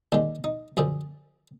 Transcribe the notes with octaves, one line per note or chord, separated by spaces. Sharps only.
D#2 D#3 G#3 D4
D#4
F#2 D3 F3 G#4